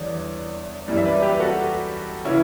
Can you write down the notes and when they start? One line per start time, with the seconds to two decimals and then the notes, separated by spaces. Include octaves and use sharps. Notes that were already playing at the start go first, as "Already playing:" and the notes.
Already playing: E2 D3 G3 C#5 D5
0.88 F#2 E3 G3
0.97 E5
1.05 B4 D5
1.22 G4 B4
1.40 F#4 A4
2.25 C#3 E3 C#4 E4